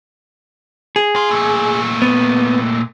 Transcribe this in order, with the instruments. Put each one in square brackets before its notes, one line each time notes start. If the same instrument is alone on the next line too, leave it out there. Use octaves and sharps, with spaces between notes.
[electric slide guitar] G#4
[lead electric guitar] F4
A#2 A3
[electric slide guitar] B3